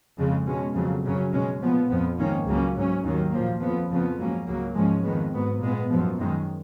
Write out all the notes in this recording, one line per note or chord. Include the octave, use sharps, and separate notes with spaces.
F2 C#3 G#3
B2 G#3 C#4
F2 C#3 F#3
F#2 C#3 F#3 C#4
B2 G#3 C#4
A#2 F3 B3
F2 F3 B3
G#2 D#3 A#3 C#4
C#2 C#3 F#3 A#3 C#4
G#2 F#3 C#4
D#2 D#3 F#3 A#3
A#2 F3 A#3
F2 F3 B3
F2 C#3 F3 B3
G#2 F#3 A#3 C#4
C#2 C#3 F#3 A#3
G#2 F3 G#3 C#4
F2 D#3 G#3 B3
G#2 F#3 B3
A#2 G#3 B3
F#2 F3 B3
F#2 D#3 G#3